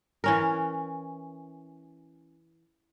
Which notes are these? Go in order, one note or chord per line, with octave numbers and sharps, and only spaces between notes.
E3 C#4 A#4